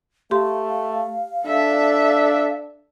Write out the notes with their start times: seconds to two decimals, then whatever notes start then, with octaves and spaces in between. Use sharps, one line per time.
0.31 A3 G4 F5 C6
1.46 D4 A4 E5